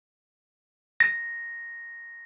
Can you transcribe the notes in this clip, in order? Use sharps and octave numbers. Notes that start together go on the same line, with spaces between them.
A#6